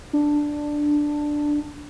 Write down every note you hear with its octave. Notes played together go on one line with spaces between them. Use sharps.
D4